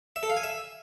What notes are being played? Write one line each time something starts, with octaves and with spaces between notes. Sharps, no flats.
E5
A4
F5
G#5
E5